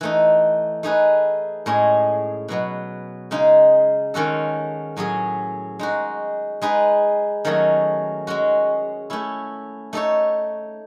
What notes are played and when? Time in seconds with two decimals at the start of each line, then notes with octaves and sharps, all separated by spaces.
0.01 E3 A3 D#4
0.83 A3 D#4 G#4 B4
1.66 A2 G#3 C#4 G#4
2.49 B2 F#3 B3
3.31 C#3 G#3 D#4 G#4
4.14 D#3 G#3 C#4 F#4 A4
4.97 A2 F#3 C#4 G#4
5.79 G#3 D#4 F#4
6.62 G#3 D#4 G#4 B4
7.45 D#3 F#3 A3 C#4 G#4
8.27 G#3 C#4 F#4
9.10 A3 C#4 E4
9.93 A3 D#4 A4 C#5